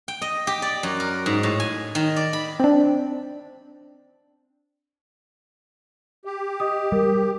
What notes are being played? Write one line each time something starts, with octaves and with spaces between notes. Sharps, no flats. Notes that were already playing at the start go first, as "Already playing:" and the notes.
G5
D#5
G4
D5
F#2
A#4
G#2
A2
G#5
D#3
D5
B5
C4 D4
G4
D#5 D#6
G3 A#4